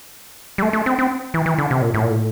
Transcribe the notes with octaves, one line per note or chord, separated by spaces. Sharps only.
G3
A3
A3
C4
C4
E3
E3
D3
C3
A#2
A2
A#2
A2